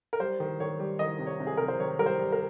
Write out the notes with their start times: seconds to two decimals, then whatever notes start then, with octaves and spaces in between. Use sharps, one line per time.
0.13 A#4
0.20 G3 C5
0.40 D#3
0.60 D#3 C#5
0.80 G3
0.99 D#3 D#5
1.19 C3
1.27 C#5
1.40 C3
1.47 G#4
1.57 C3 A#4
1.68 C5
1.79 D#3 C#5
1.99 G3 A#4
2.06 C5
2.19 G3
2.32 A#4